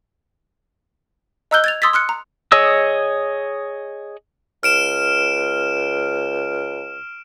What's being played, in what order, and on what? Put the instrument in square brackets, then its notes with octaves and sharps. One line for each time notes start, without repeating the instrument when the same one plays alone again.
[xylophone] D#5 A#5 E6 F#6 G6 G7
G#6 A6 F7
C6 D#6 E6 G#6 A6 B6
C6 F6 F#6 C#7
A#5
[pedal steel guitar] G#4 C#5 D#5 E6
[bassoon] C#2 [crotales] F6 D7 E7